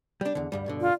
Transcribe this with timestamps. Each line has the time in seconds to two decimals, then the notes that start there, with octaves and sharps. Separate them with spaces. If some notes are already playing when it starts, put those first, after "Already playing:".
0.21 G3 D4
0.35 E2 D3
0.52 D2 G2 G3
0.66 G2 B2 D3
0.81 F4